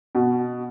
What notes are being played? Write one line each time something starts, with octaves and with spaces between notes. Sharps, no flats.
B2